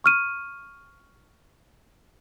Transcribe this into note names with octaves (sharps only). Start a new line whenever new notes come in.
C#6 F6 D#7